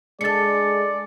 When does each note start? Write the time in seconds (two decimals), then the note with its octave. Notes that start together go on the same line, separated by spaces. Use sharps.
0.21 G#3 D4 A4 D5 A6 C#7